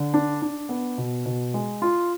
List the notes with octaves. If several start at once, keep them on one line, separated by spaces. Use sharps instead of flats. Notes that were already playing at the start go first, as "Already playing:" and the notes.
Already playing: D3
D4
D4
B3
B2
B2
G#3
F4